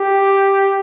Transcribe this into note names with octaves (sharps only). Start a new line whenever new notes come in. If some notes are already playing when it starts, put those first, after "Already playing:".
Already playing: G4